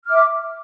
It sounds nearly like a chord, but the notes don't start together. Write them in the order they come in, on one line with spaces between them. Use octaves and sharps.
F6 D6 E5